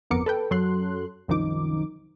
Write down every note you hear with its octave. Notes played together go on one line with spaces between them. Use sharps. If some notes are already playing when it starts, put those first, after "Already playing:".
G1 F2 B3 A#4 D6 C#7
A4 B4 G5
F#2 F#3 A4 C6 F#6
C2 F#2 D#3 F3 D#4 D6